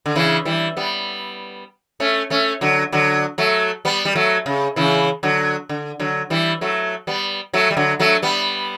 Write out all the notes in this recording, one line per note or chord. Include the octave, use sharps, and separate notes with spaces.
D3
C#3 E3
E3 G3
G3 B3
A3 C#4
A3 C#4
D3 F#3
D3 F#3
F#3 A3
G3 B3
G3
F#3 A3
C#3
C#3 E3
D3 F#3
D3
D3 F#3
E3 G3
F#3 A3
G3 B3
F#3 A3
G3
D3 F#3
F#3 A3
G3 B3